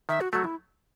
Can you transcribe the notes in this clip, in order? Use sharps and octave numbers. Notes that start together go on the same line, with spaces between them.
D#3 E5
F#4
F#3 A3 F#4
E4